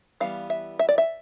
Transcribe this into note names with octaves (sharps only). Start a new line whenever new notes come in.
E3 G3 B3 F5
E5
E5
D5
E5